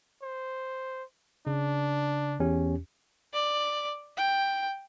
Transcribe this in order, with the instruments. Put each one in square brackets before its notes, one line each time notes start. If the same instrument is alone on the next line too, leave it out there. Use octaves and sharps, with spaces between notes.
[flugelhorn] C5
[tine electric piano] C#3 [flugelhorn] D4
[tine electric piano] E2 C#4 G4
[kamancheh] D5
G5